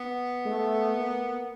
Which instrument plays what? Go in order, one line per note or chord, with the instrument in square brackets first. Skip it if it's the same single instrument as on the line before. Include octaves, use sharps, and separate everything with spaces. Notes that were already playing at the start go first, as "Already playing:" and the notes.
Already playing: [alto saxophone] B3
[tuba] A3
A#3